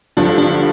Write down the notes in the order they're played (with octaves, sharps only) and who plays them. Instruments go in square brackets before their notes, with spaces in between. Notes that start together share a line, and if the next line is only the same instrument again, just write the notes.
[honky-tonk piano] G2 D3 F3 [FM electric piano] D4
[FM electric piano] D4